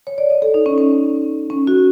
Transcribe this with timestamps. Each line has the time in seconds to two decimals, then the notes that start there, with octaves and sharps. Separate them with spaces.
0.07 C#5
0.18 D5
0.30 D#5
0.42 A4
0.54 D#4
0.66 C#4
0.78 C#4
1.50 C#4
1.67 F#4